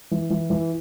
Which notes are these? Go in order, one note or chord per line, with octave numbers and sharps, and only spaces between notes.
E3
E3
E3